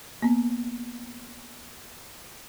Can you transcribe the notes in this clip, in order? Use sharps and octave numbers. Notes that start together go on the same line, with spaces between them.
A#3 B3